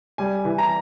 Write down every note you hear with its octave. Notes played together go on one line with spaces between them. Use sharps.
G3 G#5
E3
A#5